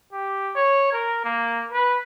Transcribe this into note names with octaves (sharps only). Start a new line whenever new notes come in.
G4
C#5
A#4
A#3
B4